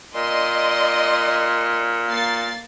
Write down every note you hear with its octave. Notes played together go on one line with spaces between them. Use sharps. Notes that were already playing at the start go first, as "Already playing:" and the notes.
A#2 D5 D#5 C6
A#3 A6 C7